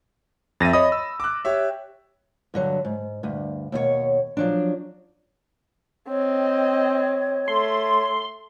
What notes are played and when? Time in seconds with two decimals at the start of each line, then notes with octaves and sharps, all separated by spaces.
0.60 F2 E5 A6 A#6 D#7
0.73 C#5 D#5 B5 D#6
0.92 E6
1.20 D6 F#6
1.45 G4 C#5 E5
2.54 G2 D3 F#3
2.85 G#2
3.23 D2 G2
3.72 D#2 B2 F#4 C#5
4.37 F3 F#3 D4
6.09 C4 C#5 D#5
7.48 A3 C6